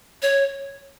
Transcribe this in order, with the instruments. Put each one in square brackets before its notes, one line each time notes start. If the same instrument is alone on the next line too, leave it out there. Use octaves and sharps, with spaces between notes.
[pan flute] C#5